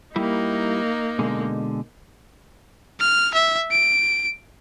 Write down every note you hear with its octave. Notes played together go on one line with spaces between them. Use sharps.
G3 A#3 D#4 E4 G4
B2 D3 G#3
F6
E5
D7